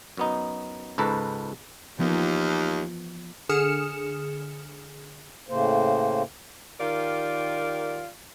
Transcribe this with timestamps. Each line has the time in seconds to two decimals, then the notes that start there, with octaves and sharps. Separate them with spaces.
0.17 F#2 B3 D#4
0.98 C#2 G#2 A4 B4 A#5
1.99 D#2 E3 F3 B3
3.49 D3 G#4 D#6 F6 C#7 E7
5.49 A2 C#3 A#3 C5
6.79 D#3 F4 G4 A#4 D5